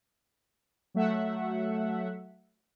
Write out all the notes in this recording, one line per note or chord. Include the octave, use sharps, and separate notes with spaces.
F#3 A3 E5 F#5